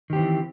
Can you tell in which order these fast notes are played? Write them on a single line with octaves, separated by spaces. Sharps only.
D#3 G4 C4 E3